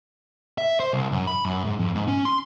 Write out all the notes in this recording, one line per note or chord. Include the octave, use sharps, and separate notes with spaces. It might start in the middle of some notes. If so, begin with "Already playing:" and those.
E5
C5
C2
F#2
B5
F#2
G#2
F2
G#2
C#4
C6